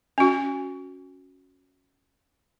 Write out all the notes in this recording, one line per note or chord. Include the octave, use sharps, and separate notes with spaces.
C#4 F#4